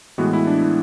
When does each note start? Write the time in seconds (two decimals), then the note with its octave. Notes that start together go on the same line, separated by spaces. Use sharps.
0.18 A2 E3 G#3 B3 F#4
0.33 E4
0.47 D4
0.61 E4